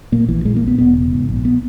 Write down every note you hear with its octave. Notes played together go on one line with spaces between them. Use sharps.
A#2 A#3
A#1 E3
A#2 G#3
A#3
A#1
B3
E1 B3
C#3
G#2
A#1
B3